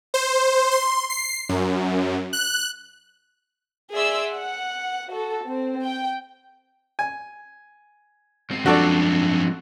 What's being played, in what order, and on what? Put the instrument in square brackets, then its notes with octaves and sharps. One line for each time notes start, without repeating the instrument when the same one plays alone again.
[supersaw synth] C5
C6
C7
F#2
F#6
[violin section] G#4 D5 E5 C6 E6
F#5
F#4 A4
C4
G5
[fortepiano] G#5
[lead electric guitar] G#2 C4
[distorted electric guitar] F#2 F3 [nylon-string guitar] D4 [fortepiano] F#4 A4 D5